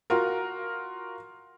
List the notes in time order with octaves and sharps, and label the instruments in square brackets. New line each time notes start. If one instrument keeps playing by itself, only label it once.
[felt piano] F4 F#4 A#4